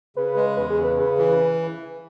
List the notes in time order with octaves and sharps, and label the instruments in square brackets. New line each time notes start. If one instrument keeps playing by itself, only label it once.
[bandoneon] C#3 [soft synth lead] B4
[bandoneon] G#3
[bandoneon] E2 [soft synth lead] B4
[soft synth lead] G#4
[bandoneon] C#3
[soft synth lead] B4
[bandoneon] C#3
E3